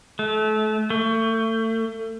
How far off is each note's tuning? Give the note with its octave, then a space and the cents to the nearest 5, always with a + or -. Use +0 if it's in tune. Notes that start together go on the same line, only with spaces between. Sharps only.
A3 -30
A3 +30